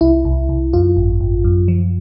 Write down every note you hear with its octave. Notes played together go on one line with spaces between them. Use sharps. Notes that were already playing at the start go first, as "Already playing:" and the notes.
C2 E4
C2
C2
F#2 F4
G#1
G#1
F#2
F3